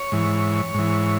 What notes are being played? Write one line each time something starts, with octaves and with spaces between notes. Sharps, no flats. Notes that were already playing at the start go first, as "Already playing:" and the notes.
Already playing: C#5
G#2 E3
G#2 E3